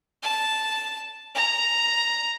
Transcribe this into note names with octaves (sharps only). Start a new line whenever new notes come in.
A5
A#5